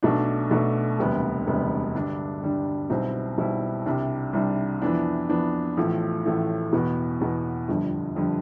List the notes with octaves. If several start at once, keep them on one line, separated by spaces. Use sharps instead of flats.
B1 B2 A3 D4
B1 B2 A3 D4
E1 D2 C3 G3 B3
E1 D2 C3 G3 B3
G2 D3 G3 D4
G2 D3 G3 D4
B1 B2 G3 C4 E4
B1 B2 G3 C4 E4
C2 C3 G3 D4
C2 C3 G3 D4
F2 E3 B3 D4
F2 E3 B3 D4
A1 A2 F3 A3
A1 A2 F3 A3
E2 B2 B3
E2 B2 B3
G1 F2 D3 G3
F2 D3 G3